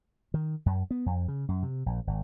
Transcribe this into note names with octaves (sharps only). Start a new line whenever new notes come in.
D#3
F#2
B3
F2
C#3
F#2
C3
A#1
G#1